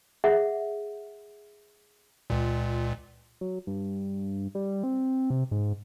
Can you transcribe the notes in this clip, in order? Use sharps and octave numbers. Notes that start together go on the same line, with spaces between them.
G#4 E5 F#5
C#2 A#2
F#3
G2
G3
C4
C3
G#2